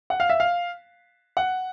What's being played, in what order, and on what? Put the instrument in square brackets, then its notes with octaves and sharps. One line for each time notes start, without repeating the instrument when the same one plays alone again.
[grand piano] F#5
F5
E5
F5
F#5